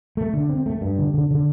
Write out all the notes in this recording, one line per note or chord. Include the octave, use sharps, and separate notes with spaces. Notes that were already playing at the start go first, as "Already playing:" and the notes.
A3
D3
C4
A3
G2
D3
D3
D3